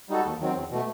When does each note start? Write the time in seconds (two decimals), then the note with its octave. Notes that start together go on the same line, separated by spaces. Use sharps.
0.09 G3 D#4 F#4 A4
0.25 D#2
0.40 D#3 F#3 C4
0.56 E2
0.71 B2 A3